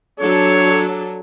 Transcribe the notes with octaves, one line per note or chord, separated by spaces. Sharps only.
F#3 D4 A4 C#5